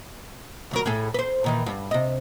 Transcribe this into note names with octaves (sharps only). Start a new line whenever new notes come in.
D2 F#3 A#4
A2 G#4 A4
B4 C5
A#2 D#3 E3
G2
C3 D#5